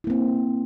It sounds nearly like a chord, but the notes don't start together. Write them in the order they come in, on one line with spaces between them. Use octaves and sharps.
E4 A#3 C4